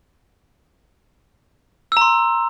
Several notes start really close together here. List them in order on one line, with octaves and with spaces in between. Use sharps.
E6 A#5 C6